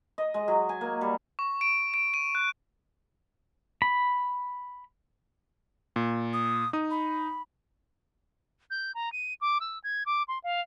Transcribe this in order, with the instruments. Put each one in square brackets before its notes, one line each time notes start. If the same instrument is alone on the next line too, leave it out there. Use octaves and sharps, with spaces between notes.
[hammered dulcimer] D#5
G#3
F#3
G#5
A#3
G3
[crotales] C#6
D7
D7
D#7
F#6
[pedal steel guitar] B5
[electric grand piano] A#2
[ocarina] D#6
[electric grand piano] D#4 D#6
[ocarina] B5
[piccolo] G6
A#5
D#7
D6
E6
G#6
D6
C6
F5